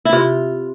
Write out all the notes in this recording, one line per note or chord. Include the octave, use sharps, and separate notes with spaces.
E4
C3 F4